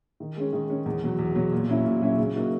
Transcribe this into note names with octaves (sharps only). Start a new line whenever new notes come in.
D#3
G#3 C#4
D#3
G#3 C#4
E2
B2 F#3
E2
B2 F#3
A#2
F#3 C#4 E4
A#2
F#3 C#4 E4
C#3
F#3 A#3 D#4 F#4